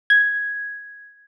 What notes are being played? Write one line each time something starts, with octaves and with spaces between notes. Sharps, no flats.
G#6